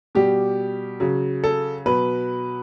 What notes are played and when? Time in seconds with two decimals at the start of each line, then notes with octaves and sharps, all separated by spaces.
0.15 B2 G3 G4
1.00 C#3 F#3
1.44 A4
1.86 B2 F#3 B4